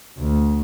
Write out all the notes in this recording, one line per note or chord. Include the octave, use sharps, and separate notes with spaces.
D2